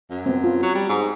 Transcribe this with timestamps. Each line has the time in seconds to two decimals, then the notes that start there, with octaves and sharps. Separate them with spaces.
0.10 F#2
0.26 B3 C4
0.44 F4
0.63 F#3
0.75 G3
0.89 G#2